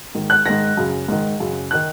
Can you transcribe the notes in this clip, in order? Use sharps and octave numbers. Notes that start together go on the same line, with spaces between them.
G#2 D#3
F#6
G#2 D#3 A#6
F#2 C#3
G#2 D#3
F#2 C#3
F#6
D#3